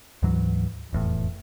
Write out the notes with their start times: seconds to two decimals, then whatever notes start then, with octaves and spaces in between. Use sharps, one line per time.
0.22 D2 G#2 E3 F#3
0.93 F1 E2 A2